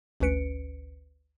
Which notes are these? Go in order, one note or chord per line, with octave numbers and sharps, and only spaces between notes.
G#1 D2 C#4 B4 C#7 D7